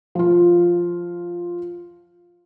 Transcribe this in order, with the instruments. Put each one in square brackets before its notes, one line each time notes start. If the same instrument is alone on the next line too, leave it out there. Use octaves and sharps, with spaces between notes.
[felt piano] F3 F4